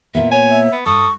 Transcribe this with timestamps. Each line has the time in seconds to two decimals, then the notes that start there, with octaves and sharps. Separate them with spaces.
0.15 A#2 A#3 B3 E5
0.32 C#5 G#5
0.50 E5
0.73 B3
0.86 G2 A4 C#6 D#6